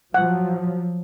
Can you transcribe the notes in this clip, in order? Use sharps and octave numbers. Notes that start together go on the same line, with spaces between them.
F3 F#3 F#5